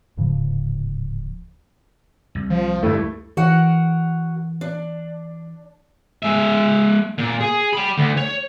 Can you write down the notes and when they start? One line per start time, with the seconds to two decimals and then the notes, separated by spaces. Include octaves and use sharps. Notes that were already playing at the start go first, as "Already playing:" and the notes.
0.17 D1 G#2 C#3 F3
2.35 C2
2.50 F3
2.83 D2 G2 A3 E4
3.37 E3 F#4 A#4 F#5
4.61 D4
6.23 G#3 E5
7.18 A#2
7.40 G#4
7.73 G5 B5
7.98 D2
8.17 C#5